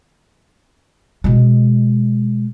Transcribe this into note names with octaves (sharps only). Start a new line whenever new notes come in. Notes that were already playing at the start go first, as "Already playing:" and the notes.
B2 G#3